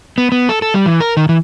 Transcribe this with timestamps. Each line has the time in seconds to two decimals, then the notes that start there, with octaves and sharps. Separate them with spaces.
0.18 B3
0.32 B3
0.49 A4
0.62 A4
0.74 G3
0.86 E3
1.01 A#4
1.17 D#3
1.29 E3